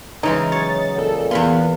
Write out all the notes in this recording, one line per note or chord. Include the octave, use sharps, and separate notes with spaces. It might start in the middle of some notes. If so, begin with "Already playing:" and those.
C#3 E3 G#3 D#4
F#3 C#5 A6
A#2 A4
E2 B3 F5 B5 C6